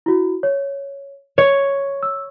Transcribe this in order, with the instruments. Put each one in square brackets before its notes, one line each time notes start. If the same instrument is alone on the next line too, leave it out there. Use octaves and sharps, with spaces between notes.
[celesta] E4 F#4
C#5
[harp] C#5 [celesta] F7
[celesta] E6